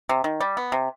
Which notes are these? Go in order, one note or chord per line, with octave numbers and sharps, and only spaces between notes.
C3
D#3
G3
B3
C3